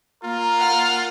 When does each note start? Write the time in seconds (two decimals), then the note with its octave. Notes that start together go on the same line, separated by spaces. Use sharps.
0.24 A#3 F4 A#4
0.58 F#5 F6